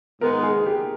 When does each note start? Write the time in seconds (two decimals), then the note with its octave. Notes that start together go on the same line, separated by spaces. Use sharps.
0.21 G#2 D#3 G#3 B3 A#4
0.43 G#4
0.66 G4